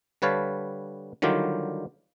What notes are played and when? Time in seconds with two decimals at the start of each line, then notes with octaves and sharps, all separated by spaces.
0.22 D3 G3 B4 C#5 F5 A5
1.22 D3 D#3 F#3 G3 F4 G4